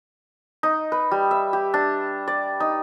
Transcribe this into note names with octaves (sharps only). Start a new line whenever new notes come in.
D#4
B4
G3
E5
G4
D4
D5
D#4